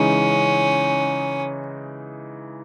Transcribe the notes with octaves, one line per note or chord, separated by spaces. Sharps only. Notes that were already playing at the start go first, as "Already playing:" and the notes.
Already playing: C#3 E3 G#3 C#4 D#4